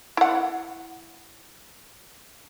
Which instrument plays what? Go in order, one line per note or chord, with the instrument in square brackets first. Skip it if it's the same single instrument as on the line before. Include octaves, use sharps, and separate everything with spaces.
[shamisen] E4 F#5